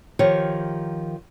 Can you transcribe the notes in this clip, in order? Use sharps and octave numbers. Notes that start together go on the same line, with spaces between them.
D#3 F3 G4 C#5